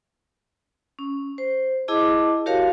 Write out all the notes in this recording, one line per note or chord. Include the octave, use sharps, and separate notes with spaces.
C#4
C5
E4 G#4 D#5 A5 D6
F#4 G4 A#4 C#5 F5 A5